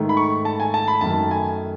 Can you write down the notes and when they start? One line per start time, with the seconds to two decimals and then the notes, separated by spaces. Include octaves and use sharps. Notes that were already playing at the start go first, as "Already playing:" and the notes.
Already playing: G#2 D#3 A3
0.09 B5
0.17 C#6
0.45 A5
0.60 G#5
0.74 A5
0.88 B5
1.01 F#2 D#3 A3 A5
1.31 G#5